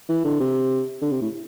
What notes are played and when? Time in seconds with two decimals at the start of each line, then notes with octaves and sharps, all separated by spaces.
0.09 E3
0.25 D3
0.40 C3
1.02 D3
1.12 C3
1.22 A2